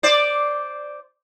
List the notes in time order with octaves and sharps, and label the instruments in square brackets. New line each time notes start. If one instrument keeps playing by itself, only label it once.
[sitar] C5 D5